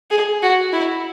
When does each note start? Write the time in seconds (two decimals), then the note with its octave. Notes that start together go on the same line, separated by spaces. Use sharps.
0.10 G#4
0.42 F#4
0.72 E4